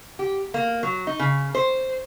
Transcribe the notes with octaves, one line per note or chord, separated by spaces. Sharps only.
G4
A#3
F#3
D#4
C#3
C5